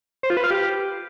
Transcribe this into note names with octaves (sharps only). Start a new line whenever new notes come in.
C5
F4
B4
F5
G4